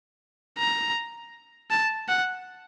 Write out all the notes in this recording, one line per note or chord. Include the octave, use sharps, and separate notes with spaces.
A#5
A5
F#5